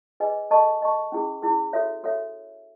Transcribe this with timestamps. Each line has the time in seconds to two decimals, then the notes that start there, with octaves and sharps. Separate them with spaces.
0.20 G#4 B4 D#5 G#5
0.51 A4 D#5 A5 C#6
0.81 A4 D#5 A5 C#6
1.12 C#4 E4 G#4
1.43 C#4 E4 G#4
1.73 F#4 A4 C#5 E5
2.03 F#4 A4 C#5 E5